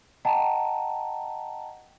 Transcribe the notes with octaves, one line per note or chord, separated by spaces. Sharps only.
D#5 F#5 G5 A5 A#5